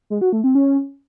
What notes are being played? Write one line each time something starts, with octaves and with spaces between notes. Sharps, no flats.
G#3
F#4
A3
C4
C#4